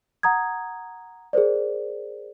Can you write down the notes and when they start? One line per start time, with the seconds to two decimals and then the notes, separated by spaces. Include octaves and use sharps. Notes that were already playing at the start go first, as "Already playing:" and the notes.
0.23 F#5 A#5 D#6 G#6
1.33 G#4 A#4 C5 D5